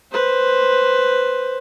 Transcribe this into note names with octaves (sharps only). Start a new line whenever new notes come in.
B4 C5